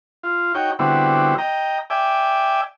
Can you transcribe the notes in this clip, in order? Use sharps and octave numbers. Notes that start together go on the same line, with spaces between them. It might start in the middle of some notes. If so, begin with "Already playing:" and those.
F4
D#4 F#4 C#5 G5
D3 G3 B3 C4 E4 F#4
D#5 G5 A#5
D5 E5 G5 G#5